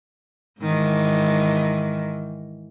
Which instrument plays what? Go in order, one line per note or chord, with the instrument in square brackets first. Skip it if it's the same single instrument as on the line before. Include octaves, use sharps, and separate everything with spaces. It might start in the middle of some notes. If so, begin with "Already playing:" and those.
[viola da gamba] G#2 D#3 E3